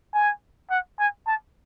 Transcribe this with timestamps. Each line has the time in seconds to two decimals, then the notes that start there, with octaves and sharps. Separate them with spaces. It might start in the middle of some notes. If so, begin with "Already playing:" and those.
0.14 G#5
0.70 F#5
0.99 G#5
1.27 A5